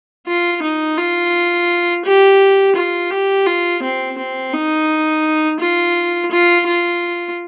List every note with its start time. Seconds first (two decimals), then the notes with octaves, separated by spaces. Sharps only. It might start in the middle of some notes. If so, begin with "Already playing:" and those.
0.27 F4
0.62 D#4
0.97 F4
2.05 G4
2.75 F4
3.11 G4
3.46 F4
3.83 C4
4.18 C4
4.53 D#4
5.60 F4
6.31 F4
6.67 F4